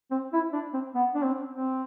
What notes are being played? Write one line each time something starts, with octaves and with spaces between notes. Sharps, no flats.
C4
E4
D4
C4
B3
D4
C4
C4